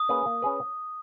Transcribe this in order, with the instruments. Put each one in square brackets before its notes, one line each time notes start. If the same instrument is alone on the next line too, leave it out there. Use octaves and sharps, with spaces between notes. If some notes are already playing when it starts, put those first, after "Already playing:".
Already playing: [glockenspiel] D#6
[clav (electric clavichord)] A#3 C#4 G#4 B4
A#3
C#4 G#4 B4